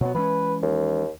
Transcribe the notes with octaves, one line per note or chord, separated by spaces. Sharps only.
B2 F#3 B3
E3 G#3 C#4 B4
D#2